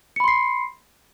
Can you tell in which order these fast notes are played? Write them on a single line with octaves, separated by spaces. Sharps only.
C#7 B5 C6 C7